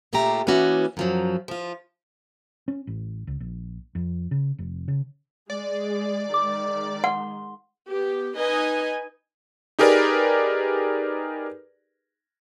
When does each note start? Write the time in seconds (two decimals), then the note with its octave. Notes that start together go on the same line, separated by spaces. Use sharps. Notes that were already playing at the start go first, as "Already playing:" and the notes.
0.13 A#2 C#3 A3 F4 G4 A#5
0.47 E3 A#3 B3 C#4 F#4
0.97 F#2 F3 F#3
1.48 F3 F4
2.68 C#4
2.87 A1
3.27 C#2
3.40 A#1
3.95 F2
4.31 C#3
4.59 F1
4.88 C#3
5.50 G#3 G#4 D5
6.34 D#3 G#3 D6
7.04 F#5 C6
7.87 B3 G4
8.37 D#4 B4 D#5 G#5
9.79 D#4 G4 G#4 A#4 B4 D5